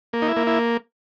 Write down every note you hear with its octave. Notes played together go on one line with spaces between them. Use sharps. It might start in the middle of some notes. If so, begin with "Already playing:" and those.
A#3
D#4
E4
A#3
E4